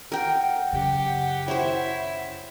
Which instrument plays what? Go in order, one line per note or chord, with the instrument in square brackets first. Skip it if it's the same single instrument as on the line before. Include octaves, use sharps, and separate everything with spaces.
[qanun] A#4 G5 [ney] F#5
[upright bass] F#2 C#3 [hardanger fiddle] G4
[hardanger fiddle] E4 [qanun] C5 C#5